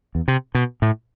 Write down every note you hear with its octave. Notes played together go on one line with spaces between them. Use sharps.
E2
C3
B2
A2